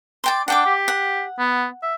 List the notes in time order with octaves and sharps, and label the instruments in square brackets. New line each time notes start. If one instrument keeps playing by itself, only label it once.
[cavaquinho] D5 G5 C6
[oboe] D4 [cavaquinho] F#5 G5 D6
[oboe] G4
[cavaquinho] F#5
[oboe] B3
E5